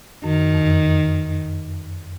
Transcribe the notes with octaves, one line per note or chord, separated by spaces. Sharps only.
F#2 D#3
F2